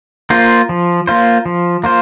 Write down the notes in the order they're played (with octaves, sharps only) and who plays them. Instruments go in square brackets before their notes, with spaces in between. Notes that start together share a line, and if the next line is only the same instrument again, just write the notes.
[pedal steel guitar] A#3 F4 C5
F3
A#3 F4 C5
F3
A#3 F4 C5